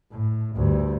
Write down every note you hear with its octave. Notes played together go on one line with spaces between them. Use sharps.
A2
D2 G2